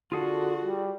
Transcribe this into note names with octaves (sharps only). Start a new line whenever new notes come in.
D3 F4 F#4 G#4 A4
G3